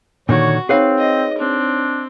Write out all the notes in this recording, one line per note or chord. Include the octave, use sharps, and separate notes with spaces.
A#2 D3 D#3 F#4 C#5
C4 D#4 G#4 B4 C#5 F5
D#5
C4 D4